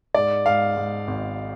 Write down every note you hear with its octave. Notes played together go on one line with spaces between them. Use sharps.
G#2 D5
G#2 F5
G#2
G#1